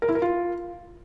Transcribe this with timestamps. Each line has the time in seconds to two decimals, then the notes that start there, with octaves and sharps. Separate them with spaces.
0.02 A#4
0.09 E4
0.15 A#4
0.22 F4